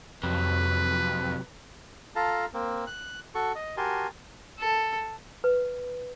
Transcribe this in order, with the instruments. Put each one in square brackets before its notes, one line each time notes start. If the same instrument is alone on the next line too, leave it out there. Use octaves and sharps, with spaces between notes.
[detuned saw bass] F2 [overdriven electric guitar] C3 F#3 [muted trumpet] B4
[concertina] F4 A4 F5 A5 A#5
A#3 C4
F#6
F#4 A4 C#6
D#5
F#4 G4 A#4 G#5 A5 C6
[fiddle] A4
[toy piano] B4